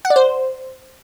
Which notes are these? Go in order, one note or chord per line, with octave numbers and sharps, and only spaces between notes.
F#5
D5
C5